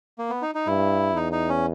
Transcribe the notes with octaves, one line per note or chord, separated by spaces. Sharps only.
A#3
B3
D#4
D#4
G2 E4
E2 D#4
D#4
C#4